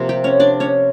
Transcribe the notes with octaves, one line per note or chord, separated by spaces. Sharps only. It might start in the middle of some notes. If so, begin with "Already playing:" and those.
Already playing: C3 F3 A#3
G4 G5
C#4 C#5
D4 D5
C#4 C#5